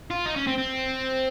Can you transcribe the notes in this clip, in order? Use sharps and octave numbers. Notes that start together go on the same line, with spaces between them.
F4
D#4
C#4
C4
C4